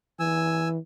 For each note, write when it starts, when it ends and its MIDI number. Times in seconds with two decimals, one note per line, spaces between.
0.20 0.78 52
0.20 0.68 80
0.20 0.68 88